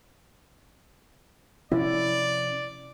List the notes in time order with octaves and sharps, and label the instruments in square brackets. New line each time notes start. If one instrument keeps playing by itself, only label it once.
[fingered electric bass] C3 F3 C#4 [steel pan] E4 [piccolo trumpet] D5